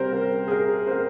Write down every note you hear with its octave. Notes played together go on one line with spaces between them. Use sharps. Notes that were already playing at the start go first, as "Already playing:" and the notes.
Already playing: C3 G3 A#4 C5
A#4
G#4
A#4
C5
A#4